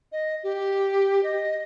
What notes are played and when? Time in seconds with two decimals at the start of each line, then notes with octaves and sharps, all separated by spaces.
0.12 D#5
0.43 G4
1.23 D#5